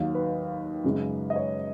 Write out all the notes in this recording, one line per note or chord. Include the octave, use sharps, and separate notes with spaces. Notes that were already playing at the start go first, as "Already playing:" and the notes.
Already playing: D#2 D#3 F#3 F5
B4
F#2 C#3 G#3
D#5
C#5